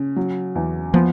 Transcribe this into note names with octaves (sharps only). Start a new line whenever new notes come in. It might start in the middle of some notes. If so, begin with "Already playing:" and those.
Already playing: C#3
F#3
E2
F3 B3